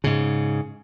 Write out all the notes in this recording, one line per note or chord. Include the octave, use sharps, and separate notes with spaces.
G#2 C#3